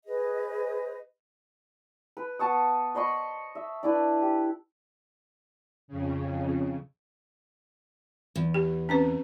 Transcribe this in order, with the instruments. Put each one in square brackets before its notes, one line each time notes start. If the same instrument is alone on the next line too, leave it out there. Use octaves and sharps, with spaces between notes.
[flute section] G#4 B4 C5 D#5
[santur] B4
B3 A5 C#6 D#6
C5 D#5 B5 C#6
E5
D4 E4 B4
G4
[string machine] F2 C#3
[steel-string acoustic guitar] E2
[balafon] G4
C4 C#4 B4